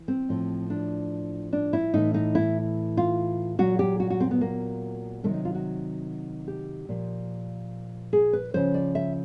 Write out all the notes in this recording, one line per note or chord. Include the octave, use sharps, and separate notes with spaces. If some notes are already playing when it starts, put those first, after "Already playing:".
Already playing: E3
C4
A2 F3
D4
D4
E4
A2 E3 D#4
D#4
E4
F4
A#2 F#3 F#4
G4
F#4
F#4
C4
B3
A#3
C3 D#3 F#3 A3
D#4
F4
F#4
G4
A#2 F3
G#4
B4
C#3 F3 C5
D5
E5